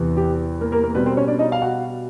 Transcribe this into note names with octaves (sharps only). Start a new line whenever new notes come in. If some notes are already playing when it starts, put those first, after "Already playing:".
Already playing: E2 C3 E3
G4
A#3 A#4
A#3 A#4
A#3 A#4
B2 G3 B3 C4 B4
C4 C5
C#4 C#5
D4 D5
D#4 D#5
F5
F#4 F#5